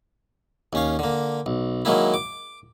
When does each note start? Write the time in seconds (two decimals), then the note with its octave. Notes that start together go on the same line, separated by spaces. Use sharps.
0.73 D#2 C#4 F5
0.99 D3 A#3
1.46 B1
1.85 D#3 F#3 G#3 A#3 E4
2.14 D6